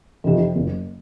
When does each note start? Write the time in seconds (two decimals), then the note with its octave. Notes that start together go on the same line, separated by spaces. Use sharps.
0.24 F2 C3 F3
0.55 F#1